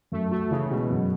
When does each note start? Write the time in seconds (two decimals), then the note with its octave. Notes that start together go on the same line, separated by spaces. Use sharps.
0.12 F#2 A3
0.31 A3 F#4
0.51 C#3 E3
0.70 B2 G#3
0.91 F#2